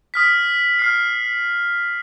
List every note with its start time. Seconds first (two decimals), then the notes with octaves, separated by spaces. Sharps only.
0.14 D#6 F6 B6
0.79 F6 C7